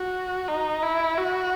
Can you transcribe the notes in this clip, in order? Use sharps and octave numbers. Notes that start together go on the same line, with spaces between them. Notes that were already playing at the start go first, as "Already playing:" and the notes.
Already playing: F#4
D#4
E4
F#4